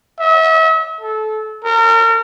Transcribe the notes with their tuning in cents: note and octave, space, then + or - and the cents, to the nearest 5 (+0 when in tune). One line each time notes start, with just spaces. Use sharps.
E5 -40
A4 -25
A#4 -35